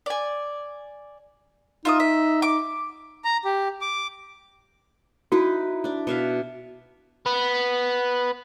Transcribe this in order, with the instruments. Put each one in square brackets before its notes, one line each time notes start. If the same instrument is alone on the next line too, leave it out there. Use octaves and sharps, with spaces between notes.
[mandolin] D5 G#5
[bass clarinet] D#4 [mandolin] F4 E5 D#6
[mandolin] E5
D6
[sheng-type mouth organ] A#5
G4
D6
[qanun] D#4 E4 B4 [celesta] F#4
[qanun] D4 D5
B2 E5 F5
[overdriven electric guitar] B3